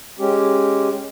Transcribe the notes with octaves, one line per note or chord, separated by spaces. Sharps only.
G#3 C#4 G4